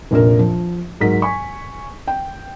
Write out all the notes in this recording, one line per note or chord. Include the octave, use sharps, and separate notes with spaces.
F1 A#1 A#2 A#4
F3
G#2 F#3 A#4 B6
G#5 C#6
G5